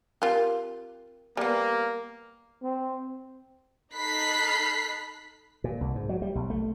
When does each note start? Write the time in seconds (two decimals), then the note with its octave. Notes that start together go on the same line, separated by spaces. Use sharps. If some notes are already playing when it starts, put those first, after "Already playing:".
0.22 C4 F4 G4 A#4
1.37 G3 A#3 B3 D5
2.62 C4
3.95 D#4 A4 B5 F#6 B6 C7
5.64 A#2
5.81 C2
5.95 G#2
6.09 F#3
6.22 G3
6.35 B1
6.50 A3